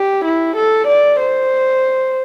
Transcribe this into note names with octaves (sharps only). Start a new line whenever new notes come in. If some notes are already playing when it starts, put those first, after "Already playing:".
Already playing: G4
E4
A4
D5
C5